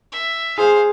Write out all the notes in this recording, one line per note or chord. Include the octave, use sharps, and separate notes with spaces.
E5
G#4 C5 F5